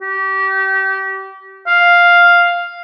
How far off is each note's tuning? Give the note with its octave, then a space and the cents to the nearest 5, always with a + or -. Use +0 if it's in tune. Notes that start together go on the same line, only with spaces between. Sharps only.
G4 -30
F5 +0